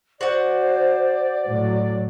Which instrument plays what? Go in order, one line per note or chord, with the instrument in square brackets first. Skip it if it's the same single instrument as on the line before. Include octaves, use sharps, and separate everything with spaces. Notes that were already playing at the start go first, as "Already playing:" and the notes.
[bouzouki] F#4 F#5 [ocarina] C5 [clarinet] D5
[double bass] A2 F#3